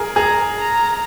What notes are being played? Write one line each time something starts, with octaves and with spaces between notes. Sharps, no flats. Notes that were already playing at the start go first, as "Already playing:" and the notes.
Already playing: G#4 A#4
G#4 A#5
A#5